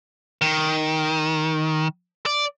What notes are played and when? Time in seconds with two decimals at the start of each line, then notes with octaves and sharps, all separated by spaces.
0.41 D#3
2.26 D5